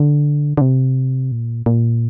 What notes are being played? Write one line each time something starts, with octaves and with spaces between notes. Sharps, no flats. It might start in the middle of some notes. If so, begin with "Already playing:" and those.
Already playing: D3
D3
C3
A#2
A#2